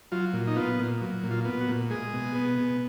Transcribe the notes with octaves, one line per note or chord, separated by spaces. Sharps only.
F#3 F4
A#2
D#4
B3 F4
A#2
F#3
A#2
F4
B3
F#4
A#2
G#3 G#4
B2
B3
B2